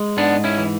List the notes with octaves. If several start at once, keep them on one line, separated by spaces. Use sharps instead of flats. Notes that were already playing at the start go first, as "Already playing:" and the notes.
Already playing: G#3
G#2 B3 D4
C#4 E4
E3